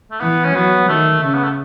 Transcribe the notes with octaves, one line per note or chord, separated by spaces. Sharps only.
A3
E3 B3
C#4
F#3 B3
D#3 A3
C#3 A3
B3
A3